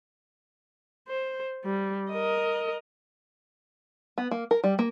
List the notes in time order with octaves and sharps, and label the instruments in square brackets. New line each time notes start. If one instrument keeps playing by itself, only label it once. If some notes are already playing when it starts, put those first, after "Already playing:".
[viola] C5
G3
A#4 D#5
[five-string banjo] B3
A#3
A#4
G3
A#3